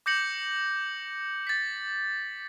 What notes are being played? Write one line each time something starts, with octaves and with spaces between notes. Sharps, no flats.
D6 G6 A#6 C#7 F#7
A6 B6